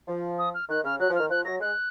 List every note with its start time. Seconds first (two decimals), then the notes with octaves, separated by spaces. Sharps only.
0.08 F3
0.38 D#6
0.54 F6
0.69 D#3 F#6
0.84 C#3 F6
1.00 F#3 F#6
1.10 F3
1.15 F6
1.20 D#3
1.30 F3 F#6
1.45 F#3 A#6
1.60 G#3 F#6